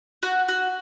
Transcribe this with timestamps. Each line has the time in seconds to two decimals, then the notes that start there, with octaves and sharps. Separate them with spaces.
0.23 F#4
0.48 F#4